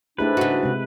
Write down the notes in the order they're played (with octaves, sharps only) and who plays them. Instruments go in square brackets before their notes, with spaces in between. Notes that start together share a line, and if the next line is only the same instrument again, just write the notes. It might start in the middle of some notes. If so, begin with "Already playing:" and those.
[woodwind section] G#2 D4 [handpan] A3 E4 G4 [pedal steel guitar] B4
[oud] C#3 F#4
[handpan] C3 G#3